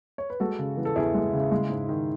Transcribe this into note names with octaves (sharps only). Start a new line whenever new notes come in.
C#5
B4
G#3 F#4 A4
C#3
E3
A4
E2 E4 G#4
G#3
C#3
G#3
G#2
D#3